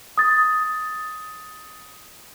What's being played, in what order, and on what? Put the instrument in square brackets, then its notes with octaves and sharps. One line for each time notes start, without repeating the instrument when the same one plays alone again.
[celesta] D#6 A6